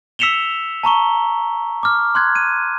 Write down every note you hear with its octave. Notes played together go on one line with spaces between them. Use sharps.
E6 B6 C#7 E7 F7 G7
A5 A#5 C#6 G7
D6 F6
C6 F#6 G#6
D#7